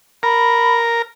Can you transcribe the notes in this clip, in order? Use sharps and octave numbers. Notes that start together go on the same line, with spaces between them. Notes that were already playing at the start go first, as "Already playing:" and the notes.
A#4 B5